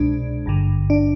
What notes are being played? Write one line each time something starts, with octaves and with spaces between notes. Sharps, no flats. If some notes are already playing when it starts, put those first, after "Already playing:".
Already playing: C2 B2 G#3 D4
G#1 G2 D3
D4